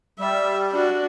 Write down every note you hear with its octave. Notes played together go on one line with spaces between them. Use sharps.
G3 E5
D4 F#4